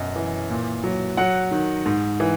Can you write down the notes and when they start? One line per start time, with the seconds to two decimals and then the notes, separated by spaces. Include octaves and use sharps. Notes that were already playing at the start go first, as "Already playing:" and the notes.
Already playing: F#2 B2 D#5
0.16 E3
0.50 A#2
0.84 F#3
1.17 F#3 F#5
1.51 D#3
1.86 G#2
2.20 E3